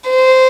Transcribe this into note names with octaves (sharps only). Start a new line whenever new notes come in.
C5